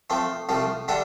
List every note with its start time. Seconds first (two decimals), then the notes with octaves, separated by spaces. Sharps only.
0.10 F3 A3 C4
0.49 C2 C3 F3 A3
0.88 D3 G3 D4 A4 E5